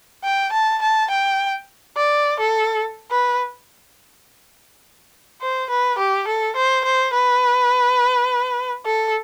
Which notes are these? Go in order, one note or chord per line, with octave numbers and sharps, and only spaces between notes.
G5
A5
A5
G5
D5
A4
B4
C5
B4
G4
A4
C5
C5
B4
A4